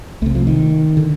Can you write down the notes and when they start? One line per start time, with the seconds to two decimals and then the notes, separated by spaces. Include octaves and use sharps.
0.22 C2 A3
0.26 C3
0.35 F3
0.47 D#3
0.97 D3